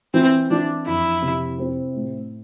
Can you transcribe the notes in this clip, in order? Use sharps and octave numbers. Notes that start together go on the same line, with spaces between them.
E3 C4
E3 D4
F2 E4
C3
C4
A2